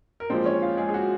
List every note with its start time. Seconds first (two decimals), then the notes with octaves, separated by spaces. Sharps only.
0.20 A#4
0.30 A#2 F3 G#3 C4 C5
0.45 C#4 C#5
0.62 F4 F5
0.77 G#3 G#4
0.89 G#4
0.94 F#4